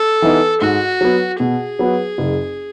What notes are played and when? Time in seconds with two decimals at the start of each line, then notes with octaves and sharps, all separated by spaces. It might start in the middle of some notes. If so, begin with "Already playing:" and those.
Already playing: A4
0.22 E3 B3 D#4
0.61 G#2 F#4
1.01 F#3 B3
1.39 B2 G#4
1.79 F#3 B3
2.18 F#1